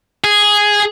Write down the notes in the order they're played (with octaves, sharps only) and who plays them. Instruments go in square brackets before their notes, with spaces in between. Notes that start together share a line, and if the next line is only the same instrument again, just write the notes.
[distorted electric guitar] G#4